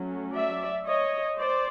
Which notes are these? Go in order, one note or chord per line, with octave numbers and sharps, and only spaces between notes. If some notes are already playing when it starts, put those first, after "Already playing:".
Already playing: F#3 A3 C#4
D5 E5
C#5 D#5
C5 D5